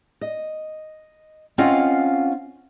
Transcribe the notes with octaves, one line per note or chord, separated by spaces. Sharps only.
D#5
C4 C#4 F4 D#5 F5 F#5